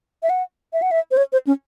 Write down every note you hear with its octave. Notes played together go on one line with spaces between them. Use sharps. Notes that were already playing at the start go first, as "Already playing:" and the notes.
E5
F#5
E5
F#5
E5
C5
C#5
C5
C#4